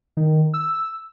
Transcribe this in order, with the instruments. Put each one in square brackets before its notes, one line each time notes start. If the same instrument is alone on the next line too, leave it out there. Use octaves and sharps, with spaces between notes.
[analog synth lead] D#3
E6